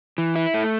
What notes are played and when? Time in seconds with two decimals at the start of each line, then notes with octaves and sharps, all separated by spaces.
0.18 E3
0.36 E4
0.54 A3